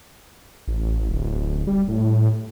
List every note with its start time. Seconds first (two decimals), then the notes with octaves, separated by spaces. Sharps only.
0.67 A1
1.09 D1
1.67 G3
1.88 A2